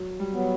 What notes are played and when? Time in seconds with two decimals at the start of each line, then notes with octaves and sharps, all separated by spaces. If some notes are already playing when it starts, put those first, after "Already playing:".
Already playing: F#3
0.19 G3
0.32 F#3 B3